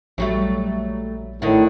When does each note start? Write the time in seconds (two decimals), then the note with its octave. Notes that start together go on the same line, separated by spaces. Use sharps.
0.18 A#1 F#3 G3 A3
1.42 A2 D3 D#3